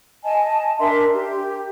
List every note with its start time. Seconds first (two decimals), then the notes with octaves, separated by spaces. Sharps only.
0.23 D#5 G#5 A5
0.79 D4 A#4 E5 C6
1.13 G4